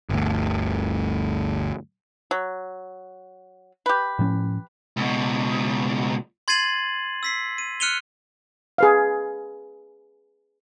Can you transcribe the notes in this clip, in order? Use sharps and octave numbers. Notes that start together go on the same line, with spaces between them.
G1 D2
F#3
G4 B4
A2 F3 C#4
C#2 B2
C6 G#6 A6 C7 D#7 F#7
E6 B6 C7
D#7
F6 F#6 C#7 D#7 F7 G7
G#4 B4 F5